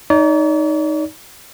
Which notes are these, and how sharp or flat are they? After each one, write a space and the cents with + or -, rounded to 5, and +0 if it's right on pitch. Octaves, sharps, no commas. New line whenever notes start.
D#4 +0 D5 -45